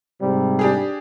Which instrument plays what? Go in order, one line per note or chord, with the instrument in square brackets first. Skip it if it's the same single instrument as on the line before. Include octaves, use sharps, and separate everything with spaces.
[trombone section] G#2 C3 G3
[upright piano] D4 G4 G#4